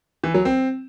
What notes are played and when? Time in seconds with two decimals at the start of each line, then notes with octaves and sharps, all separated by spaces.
0.24 E3
0.34 F#3
0.45 C4